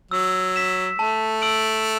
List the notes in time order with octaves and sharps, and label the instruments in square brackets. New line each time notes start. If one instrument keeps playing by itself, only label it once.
[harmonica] F#3 [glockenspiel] E6
[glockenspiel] B6 E7
[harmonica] A3 [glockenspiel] A5
[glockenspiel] E6 D7 F#7